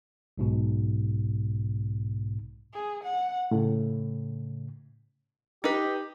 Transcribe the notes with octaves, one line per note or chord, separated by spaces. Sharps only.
B1 G#2 B2
G#4
F#5
A2 C#3
D#4 G4 B4